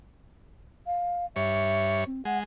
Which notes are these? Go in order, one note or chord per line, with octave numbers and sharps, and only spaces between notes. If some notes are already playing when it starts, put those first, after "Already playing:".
F5
G2 C#5 E5
C4
G#3 F#5